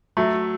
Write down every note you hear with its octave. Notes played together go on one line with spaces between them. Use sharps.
F#3 A3